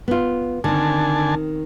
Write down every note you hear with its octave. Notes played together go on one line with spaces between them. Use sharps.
B3 F4
D3 D#3 C4 G#5 A5